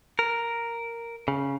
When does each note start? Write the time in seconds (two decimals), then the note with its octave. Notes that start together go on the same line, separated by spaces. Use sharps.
0.19 A#4
1.28 C#3